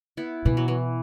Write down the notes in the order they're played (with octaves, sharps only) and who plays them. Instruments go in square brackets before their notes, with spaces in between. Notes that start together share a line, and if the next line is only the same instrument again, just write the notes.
[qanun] B3 E4
[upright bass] B2 [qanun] E3
[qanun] F#3
E3